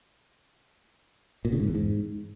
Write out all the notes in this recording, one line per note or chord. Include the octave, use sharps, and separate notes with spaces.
A#2
C#3
G#2
E2
G#2